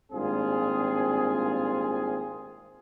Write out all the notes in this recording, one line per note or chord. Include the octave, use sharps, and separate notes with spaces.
G#1 G2 A#2 C4 F4 G#4